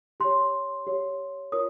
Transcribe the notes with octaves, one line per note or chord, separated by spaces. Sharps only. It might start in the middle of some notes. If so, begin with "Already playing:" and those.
G4 C#5 C6
G4 C#5
F4 A#4 C#5 D#6